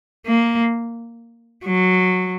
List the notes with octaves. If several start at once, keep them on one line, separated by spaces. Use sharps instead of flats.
A#3
F#3